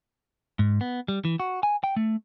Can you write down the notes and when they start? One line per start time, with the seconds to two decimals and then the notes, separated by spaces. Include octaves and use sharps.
0.59 G#2
0.81 B3
1.08 G3
1.25 E3
1.40 F#4
1.63 G#5
1.84 G5
1.96 A3